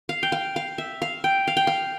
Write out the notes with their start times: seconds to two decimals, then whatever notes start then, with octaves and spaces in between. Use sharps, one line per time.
0.09 F5
0.23 G5
0.32 F5
0.56 F5
0.78 E5
1.02 F5
1.24 G5
1.48 F5
1.57 G5
1.67 F5